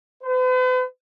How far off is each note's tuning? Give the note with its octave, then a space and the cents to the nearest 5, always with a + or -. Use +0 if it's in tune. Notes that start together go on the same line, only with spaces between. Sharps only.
B4 +45